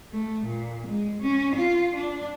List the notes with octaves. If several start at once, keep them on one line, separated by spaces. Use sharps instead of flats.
A3
A#2
G#3
C#4
F4
D4